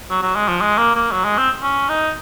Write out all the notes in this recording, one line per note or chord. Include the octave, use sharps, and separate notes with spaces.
F#3
F#3
G#3
F3
G#3
A#3
A#3
F#3
G#3
C4
C#4
D#4